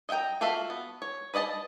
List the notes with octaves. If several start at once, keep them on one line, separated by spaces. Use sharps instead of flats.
D#5 E5 F#5 G5 A#5
F4 F#4 A4 E5 F5
B3
C#5
B4 D5 D#5 G#5 A5